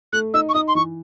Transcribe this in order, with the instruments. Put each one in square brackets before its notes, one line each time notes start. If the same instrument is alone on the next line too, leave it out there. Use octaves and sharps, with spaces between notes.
[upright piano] A3 [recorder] F#6
[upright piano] D#4 [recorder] E6
[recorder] C#6
[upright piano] D#4 [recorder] D#6
[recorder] C6
[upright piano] E3 [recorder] C#6